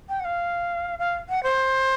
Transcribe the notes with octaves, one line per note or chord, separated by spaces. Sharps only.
G5
F#5
F5
F5
F#5
C5